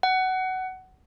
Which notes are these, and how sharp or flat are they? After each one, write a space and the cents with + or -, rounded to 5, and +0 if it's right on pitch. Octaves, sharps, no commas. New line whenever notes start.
F#5 +20